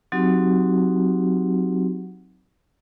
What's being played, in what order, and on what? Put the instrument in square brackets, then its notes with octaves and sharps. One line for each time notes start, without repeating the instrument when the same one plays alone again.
[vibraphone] F#3 C4 D#4 F#4 G4